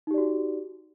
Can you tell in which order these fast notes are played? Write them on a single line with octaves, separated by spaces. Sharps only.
D#4 G4 D5 F#4